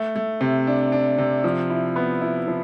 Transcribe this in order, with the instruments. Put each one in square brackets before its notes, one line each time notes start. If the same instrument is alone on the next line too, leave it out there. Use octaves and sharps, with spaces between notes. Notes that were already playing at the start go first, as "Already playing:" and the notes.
Already playing: [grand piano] A3
A3
C3
D4
D4
C3
F3
E4
B3
E4
F3